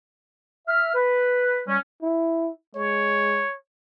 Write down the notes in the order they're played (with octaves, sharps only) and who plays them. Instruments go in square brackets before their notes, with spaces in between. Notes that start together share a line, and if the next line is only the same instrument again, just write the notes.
[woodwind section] E5 F6
B4
G3 C#4
[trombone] E4
[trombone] G#3 [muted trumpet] C#5